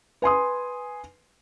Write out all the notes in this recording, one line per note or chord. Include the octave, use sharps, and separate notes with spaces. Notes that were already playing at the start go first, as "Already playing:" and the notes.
B4 G#5 C6 D#6